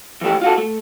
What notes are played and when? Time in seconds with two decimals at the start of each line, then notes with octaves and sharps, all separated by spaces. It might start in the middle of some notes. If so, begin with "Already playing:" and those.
0.21 E3 F3 A3 G4
0.41 F4 F#4 A4
0.58 A3